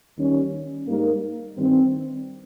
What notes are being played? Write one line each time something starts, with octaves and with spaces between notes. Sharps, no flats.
D#2 D#3 G3 C#4
G#2 G3 A#3 D#4 A#4
G2 D#3 G3 C4